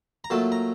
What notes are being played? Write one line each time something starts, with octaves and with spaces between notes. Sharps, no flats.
A#5
A#2 F#3 A3 A5
A#5